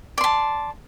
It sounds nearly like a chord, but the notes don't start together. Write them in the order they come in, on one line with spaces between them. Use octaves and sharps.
D5 C6 A5